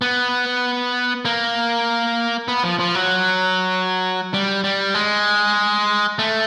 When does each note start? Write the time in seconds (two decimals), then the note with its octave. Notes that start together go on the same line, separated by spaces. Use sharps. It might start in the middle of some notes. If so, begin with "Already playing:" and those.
0.02 B3
1.25 A#3
2.48 B3
2.63 F3
2.79 F3
2.95 F#3
4.34 G3
4.64 G3
4.94 G#3
6.19 A3